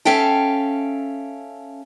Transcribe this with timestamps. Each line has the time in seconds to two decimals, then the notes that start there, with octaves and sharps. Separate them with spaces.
0.05 C#4 A4 E5 F5 G5 A5